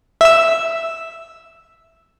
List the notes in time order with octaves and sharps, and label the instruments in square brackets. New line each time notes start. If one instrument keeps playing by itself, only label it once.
[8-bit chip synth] E5 E6